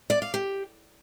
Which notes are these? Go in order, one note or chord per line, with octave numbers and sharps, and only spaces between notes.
D5
F5
G4